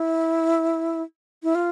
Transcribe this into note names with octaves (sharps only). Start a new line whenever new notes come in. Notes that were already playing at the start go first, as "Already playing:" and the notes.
Already playing: E4
E4
F4